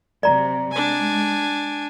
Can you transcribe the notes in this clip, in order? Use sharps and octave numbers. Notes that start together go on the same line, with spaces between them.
C3 F#3 D5 A#5
G#3 D4 G#5